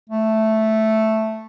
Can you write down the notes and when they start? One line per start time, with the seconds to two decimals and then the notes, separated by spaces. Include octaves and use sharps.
0.09 A3